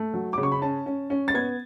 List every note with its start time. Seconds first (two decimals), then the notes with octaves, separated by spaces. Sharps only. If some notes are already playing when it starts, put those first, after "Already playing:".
Already playing: A3
0.14 F#3
0.33 C#3 D6
0.43 C#6
0.52 B5
0.62 C#4 A5
0.86 C#4
1.10 C#4
1.28 A6
1.34 B3 G#6